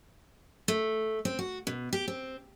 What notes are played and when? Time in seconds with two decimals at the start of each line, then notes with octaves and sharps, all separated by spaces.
0.68 A3
1.25 C4
1.39 F#4
1.67 B2
1.93 G4
2.08 C4